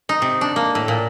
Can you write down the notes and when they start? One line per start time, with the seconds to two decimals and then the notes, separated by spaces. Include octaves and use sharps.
0.09 D#4
0.22 C3
0.41 D4
0.56 A#3
0.75 A2
0.88 A#2